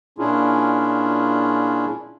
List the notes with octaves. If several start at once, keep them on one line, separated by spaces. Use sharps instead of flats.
A#2 C#4 D4 E4 F4 G#4